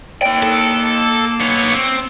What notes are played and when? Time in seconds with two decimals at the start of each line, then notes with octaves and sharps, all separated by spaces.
0.22 A#3 G5
0.43 A4
1.41 B3 C#5
1.74 C4